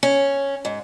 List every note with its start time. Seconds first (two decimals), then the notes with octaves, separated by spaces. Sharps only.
0.03 C#4
0.65 G#2